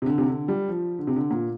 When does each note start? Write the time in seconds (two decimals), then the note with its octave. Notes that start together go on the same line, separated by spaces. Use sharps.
0.02 C3
0.06 D3
0.18 C3
0.28 D3
0.48 G3
0.68 F3
0.99 D3
1.07 C3
1.16 D3
1.31 A#2